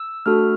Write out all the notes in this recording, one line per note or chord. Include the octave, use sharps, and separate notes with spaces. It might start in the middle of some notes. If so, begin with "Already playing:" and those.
Already playing: E6
A3 D4 F#4 A4 F6